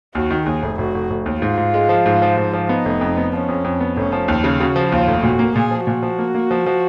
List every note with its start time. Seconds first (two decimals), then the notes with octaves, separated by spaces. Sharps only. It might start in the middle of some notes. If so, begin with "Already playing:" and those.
0.15 D#2 F#4
0.30 D#3
0.46 D#2 G#4
0.63 F1
0.78 F1 F#4
0.94 F1
1.10 F1
1.26 D#2
1.41 G#2 F4
1.57 G#2
1.74 G#3
1.89 F3
2.06 G#2
2.22 F3
2.37 G#2
2.53 F3
2.69 B3 D#4
2.85 F1
3.01 F2
3.17 B3
3.33 F3 C#4
3.49 F2
3.64 F2
3.80 B3
3.97 F1 C#4
4.12 F3
4.28 D#2
4.44 C#3
4.60 C#3 F#4
4.76 F3
4.92 D#2 F4
5.07 F1
5.23 A#2 F#4
5.39 A#3
5.55 A#2 G#4
5.71 F3
5.87 A#2 F#4
6.03 F3
6.19 A#3
6.34 A#3
6.51 F3
6.66 F3